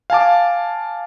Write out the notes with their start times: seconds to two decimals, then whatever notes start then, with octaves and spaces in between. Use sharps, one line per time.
0.10 F5 G#5 A5 D6